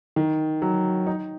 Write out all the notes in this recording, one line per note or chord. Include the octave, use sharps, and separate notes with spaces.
D#3
F#3
D#4